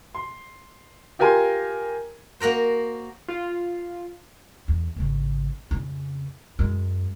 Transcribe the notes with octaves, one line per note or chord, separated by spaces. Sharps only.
C6
F4 G4 A#4 G#5 A#5 C6
A#3 F#4 A#4 C5
F4
E2
G#1 C#3
F2 C#3
F#2 G#3